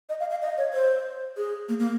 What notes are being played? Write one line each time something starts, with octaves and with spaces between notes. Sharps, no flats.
D#5
F5
F5
D#5
C#5
C5
G#4
A#3
A#3